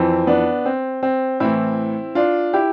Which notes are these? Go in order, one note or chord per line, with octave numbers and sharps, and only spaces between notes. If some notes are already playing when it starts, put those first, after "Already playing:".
Already playing: F2 E3 C4
B3 D4
C4
C4
A2 E3 C4 E4
D4 F4
E4 G4